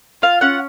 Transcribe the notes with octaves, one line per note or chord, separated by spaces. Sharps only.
F4 F5
C#4 F#5